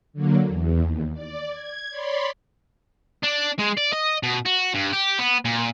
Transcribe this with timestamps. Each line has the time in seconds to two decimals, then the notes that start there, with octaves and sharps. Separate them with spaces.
0.13 D3 F#3 A#3
0.48 E2
0.82 D#2
1.13 D5
1.49 G#6
1.90 C#5 D5 B5 C6
3.24 D4
3.59 G#3
3.78 D5
3.93 D#5
4.23 B2
4.45 F#4
4.74 G2
4.92 G4
5.18 B3
5.45 A#2